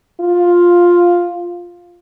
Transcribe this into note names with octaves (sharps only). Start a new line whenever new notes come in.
F4